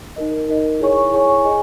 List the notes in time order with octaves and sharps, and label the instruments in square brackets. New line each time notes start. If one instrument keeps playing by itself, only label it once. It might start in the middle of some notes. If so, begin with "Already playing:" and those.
[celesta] D#4 A#4 D#5
D#4 A#4 D#5
E4 G#4 C#5 G#5 C#6
E4 G#4 C#5 G#5 C#6
G#4 D#5 G#5